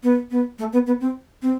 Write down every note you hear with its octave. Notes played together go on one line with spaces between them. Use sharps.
B3
B3
A3
B3
B3
C4
C4